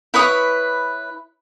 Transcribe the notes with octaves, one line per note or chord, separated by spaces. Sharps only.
E4 B4 C#5 D#6